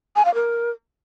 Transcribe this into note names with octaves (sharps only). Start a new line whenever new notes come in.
G#5
F5
A#4